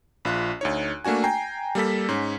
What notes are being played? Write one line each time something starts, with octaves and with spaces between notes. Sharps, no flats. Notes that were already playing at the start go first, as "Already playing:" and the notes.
A#1 F4 F#6
D2 D#4 C#5
A3 A#3 D4 F#4 G#5
G5 G#5 A#5 C7
G3 A#3 A4 B6
G#2 C#4